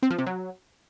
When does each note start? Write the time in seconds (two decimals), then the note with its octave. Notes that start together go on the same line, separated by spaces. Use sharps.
0.03 C4
0.11 F3
0.18 C3
0.26 F#3